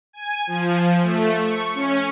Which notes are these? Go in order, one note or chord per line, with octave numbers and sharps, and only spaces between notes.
G#5
F3
A3
C#6
C#4